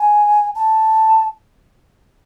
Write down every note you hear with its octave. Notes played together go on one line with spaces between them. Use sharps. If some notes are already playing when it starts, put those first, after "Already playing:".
Already playing: G#5
A5